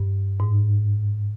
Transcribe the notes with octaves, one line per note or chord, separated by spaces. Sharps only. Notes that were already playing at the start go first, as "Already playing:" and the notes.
Already playing: G2
G#2